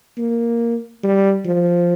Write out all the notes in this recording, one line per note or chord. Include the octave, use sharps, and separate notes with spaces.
A#3
G3
F3